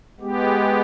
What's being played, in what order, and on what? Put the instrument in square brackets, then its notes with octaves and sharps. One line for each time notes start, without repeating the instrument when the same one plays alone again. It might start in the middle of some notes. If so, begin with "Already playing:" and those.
[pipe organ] G#3 B3 G4